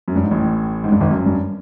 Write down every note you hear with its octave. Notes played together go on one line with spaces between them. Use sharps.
F#2
G2
G#2
A1 A2
G#2
G2
G#1 G#2
F#2
G2